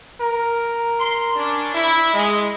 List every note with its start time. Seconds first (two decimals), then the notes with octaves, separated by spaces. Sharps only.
0.20 A#4
0.99 C6
1.35 C#4 D4
1.74 E4
2.13 G#3 D#5